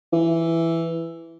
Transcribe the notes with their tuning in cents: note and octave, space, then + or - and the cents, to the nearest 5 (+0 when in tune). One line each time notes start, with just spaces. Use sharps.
E3 +5